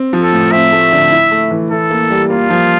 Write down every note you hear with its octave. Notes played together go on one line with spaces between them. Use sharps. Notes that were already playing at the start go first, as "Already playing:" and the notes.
Already playing: C4
F3
A4
A2
C4 E5
A3
D3
E4
A3
E3
E4 A4
A#3
G3
A#3 F4
F3